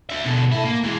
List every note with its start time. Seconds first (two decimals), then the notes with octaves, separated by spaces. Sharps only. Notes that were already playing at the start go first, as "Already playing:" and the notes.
0.10 D4 E5
0.25 B2 D3
0.52 E4 A4
0.64 A#3
0.83 E3 G#3